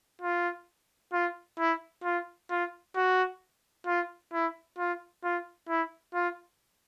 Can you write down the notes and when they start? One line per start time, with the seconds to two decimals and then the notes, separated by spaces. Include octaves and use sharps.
0.22 F4
1.13 F4
1.59 E4
2.04 F4
2.50 F4
2.96 F#4
3.87 F4
4.33 E4
4.79 F4
5.24 F4
5.69 E4
6.14 F4